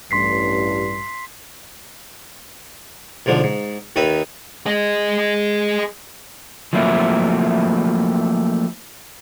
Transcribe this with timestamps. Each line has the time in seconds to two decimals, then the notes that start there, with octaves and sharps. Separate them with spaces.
0.11 A1 G2 C6 B6 C7
3.26 B1 G#2 D3 F3
3.44 G#2
3.96 D#2 D#3 D#4 B4 E5
4.66 G#4 D#5
6.73 F3 F#3 A3 A#3 C4 E4